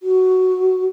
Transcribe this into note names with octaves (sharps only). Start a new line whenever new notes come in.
F#4